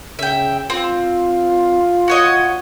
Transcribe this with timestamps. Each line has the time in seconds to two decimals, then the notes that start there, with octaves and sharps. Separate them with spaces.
0.19 C#3 E5 G5
0.70 C4 F4
2.08 F#4 C#5 D#5